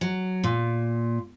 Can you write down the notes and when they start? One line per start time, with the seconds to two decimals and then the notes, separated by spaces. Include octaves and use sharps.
0.01 F#3
0.44 A#2